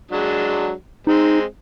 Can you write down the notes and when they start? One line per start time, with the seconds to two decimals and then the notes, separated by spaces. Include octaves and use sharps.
0.11 F#3 G#3 D4
1.07 G#3 C4 D#4